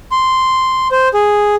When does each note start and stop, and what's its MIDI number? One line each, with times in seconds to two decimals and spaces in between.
0.12 0.88 84
0.92 1.08 72
1.14 1.55 68